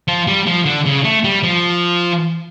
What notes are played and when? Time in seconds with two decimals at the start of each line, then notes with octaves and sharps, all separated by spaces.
0.08 F3
0.27 G3
0.47 F3
0.65 D3
0.86 C#3
1.04 A3
1.24 G3
1.43 F3